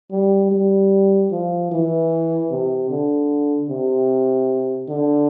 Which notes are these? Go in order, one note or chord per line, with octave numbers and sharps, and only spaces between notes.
G3
G3
F3
E3
C3
D3
C3
D3